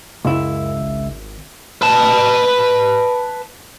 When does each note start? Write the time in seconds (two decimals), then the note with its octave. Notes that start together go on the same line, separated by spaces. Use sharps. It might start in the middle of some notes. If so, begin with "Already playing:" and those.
0.25 C#2 F#2 E4
0.80 G#1
1.82 B4 A5